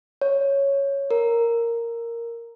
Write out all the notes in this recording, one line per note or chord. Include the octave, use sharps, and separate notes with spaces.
C#5
A#4